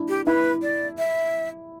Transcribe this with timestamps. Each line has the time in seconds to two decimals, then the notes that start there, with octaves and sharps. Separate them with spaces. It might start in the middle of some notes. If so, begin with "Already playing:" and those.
Already playing: D4 E4
0.09 G4
0.26 E4 B4
0.62 D5
0.98 E5